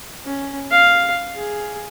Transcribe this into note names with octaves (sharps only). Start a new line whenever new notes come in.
C#4
F5
G#4